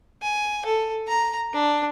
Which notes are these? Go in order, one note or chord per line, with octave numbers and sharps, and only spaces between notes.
G#5
A4
A#5
D4